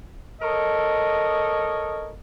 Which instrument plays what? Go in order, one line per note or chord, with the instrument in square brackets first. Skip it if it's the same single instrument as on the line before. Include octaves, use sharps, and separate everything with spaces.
[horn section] A4 A#4 C#5 D#5